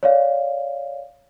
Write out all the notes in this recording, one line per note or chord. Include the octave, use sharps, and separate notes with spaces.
C#5 D5 F5